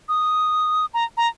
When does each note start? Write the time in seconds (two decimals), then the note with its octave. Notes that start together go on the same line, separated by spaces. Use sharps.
0.09 D#6
0.94 A#5
1.17 A#5